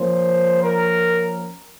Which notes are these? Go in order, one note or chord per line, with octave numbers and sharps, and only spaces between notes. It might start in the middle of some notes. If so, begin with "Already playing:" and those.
Already playing: F3 A#3 C#4 C5
A#4